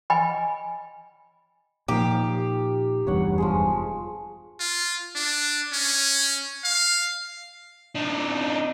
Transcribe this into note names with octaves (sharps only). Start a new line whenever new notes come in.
D#5 G5 G#5 B5
A#2 F3 D#4 G4 F5
F1 E2 G2 C#5 F#5
F3 G#3 G#4
F4
D4
C#4
F5
D4 D#4